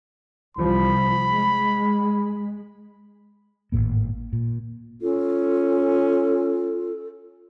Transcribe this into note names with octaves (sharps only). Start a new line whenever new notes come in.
C2 F3 B5
G#3
G#1 E2 A2 A#3
A#2
C#4 F4 A4